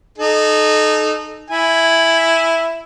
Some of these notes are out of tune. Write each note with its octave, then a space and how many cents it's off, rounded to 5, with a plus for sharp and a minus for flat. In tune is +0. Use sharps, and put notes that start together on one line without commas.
D#4 -20 A4 -30
E4 +0 G#5 +0